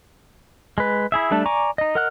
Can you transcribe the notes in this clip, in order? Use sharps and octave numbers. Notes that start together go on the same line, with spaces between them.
G#3 B4
E4 G#4 E5
G3 A3 D4 A4 E5
D5 G#5 A#5 C#6 D6
D#4 D#5
A#4 D#5 F#5 F6 F#6